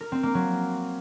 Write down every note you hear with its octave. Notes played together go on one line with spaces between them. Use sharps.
A#4
C4
A#3
F#3